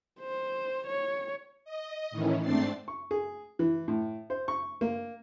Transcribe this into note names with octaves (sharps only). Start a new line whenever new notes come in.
C5
C#5
D#5
A2 D#3 E3 C#4
G#2 A3 C4 D4 A6 C7
C#6
G#4
E3
A2
C5
C#6
A#3